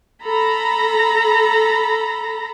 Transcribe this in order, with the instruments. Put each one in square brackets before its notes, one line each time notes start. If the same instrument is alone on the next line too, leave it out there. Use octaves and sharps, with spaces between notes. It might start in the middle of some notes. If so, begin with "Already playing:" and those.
[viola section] A4 A#5 B5